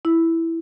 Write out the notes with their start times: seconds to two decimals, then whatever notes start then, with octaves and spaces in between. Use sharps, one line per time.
0.05 E4